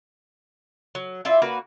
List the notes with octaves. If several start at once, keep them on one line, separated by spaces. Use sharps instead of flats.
F#3
E4 F4 D5 E5
A#3 F#4 B4